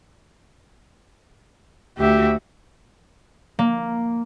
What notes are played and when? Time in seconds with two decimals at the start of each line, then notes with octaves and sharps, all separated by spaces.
1.98 D2 F#4 G4 E5
3.59 A#3